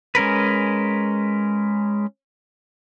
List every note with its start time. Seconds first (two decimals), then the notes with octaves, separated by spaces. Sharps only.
0.15 G#3 C#4 A#4 B4